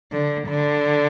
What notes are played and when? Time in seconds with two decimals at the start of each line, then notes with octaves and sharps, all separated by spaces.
0.12 D3
0.48 D3